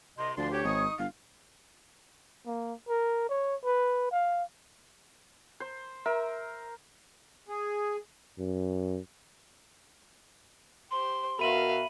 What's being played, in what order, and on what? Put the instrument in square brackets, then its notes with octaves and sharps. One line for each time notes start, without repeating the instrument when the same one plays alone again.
[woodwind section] C2 C3 D#5 [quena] C6
[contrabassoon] D2 [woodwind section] F3 C6 [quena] D5
[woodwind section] F#4 G4 [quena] C#5
[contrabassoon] G#1 [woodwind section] D#4 C#6 D#6
[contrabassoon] G1 [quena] F5
[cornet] A#3
A#4
C#5
B4
F5
[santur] C5
[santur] A#4 [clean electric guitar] E5
[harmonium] G#4
[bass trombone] F#2
[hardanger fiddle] G4 C5 [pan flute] C6
[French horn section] B2 F#4 A#4 [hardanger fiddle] E5 F5 [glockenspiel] B5 D#7 F#7